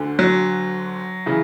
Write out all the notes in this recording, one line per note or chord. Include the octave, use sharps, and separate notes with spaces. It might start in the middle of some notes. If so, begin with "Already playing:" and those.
Already playing: D2 D3
F#3
C#3 E3